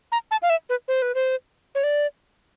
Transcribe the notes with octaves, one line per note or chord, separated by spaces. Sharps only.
A#5
A5
F5
E5
B4
C5
B4
C5
C#5
D5